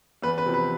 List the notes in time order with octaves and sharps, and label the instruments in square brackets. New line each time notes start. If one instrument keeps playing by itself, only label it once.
[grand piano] E2 [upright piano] B4
[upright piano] B4
[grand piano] C3 F3
[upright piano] B4